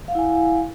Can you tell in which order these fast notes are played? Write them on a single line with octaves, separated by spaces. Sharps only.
F5 F#5 E4 G#5